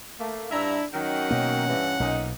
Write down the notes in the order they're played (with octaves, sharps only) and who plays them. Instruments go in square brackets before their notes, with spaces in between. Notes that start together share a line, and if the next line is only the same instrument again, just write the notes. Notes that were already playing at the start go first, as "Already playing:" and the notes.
[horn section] A3 A#3
[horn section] G2 E5 A#5 [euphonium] D4 [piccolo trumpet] E4
[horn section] D#3 F#3 D#4 [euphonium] C#4 [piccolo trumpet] F#5
[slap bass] B2 A#3
[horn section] G2 E3
[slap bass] B1 [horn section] A#2 D#4